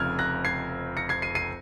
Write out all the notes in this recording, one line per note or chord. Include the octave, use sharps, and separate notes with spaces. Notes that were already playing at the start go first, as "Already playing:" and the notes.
Already playing: F1 F2 C#3 F3 F6 G#6
F#6 A#6
G#6 C7
A#6 C#7
G#6 C7
C7 D#7
C7 D#7